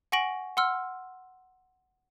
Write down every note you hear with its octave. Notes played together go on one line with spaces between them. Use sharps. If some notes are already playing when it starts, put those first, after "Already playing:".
F#5 G#5 C#6 A#6 D7 F#7
F#5 C6 E6 F6